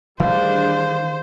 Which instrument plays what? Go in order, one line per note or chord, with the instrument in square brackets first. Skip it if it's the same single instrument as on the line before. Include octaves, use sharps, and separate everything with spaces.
[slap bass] D#3 E3 A3 [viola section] G3 D4 G#4 [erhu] C5 [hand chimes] F5